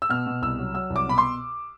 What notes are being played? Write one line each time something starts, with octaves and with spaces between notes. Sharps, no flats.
E6
B2 F6
B2
C2 E6
F#3
F#3 E6
C2
D6
B2 B5
C6